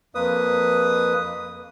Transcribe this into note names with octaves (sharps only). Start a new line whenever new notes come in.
F2 A#3 B4 D#6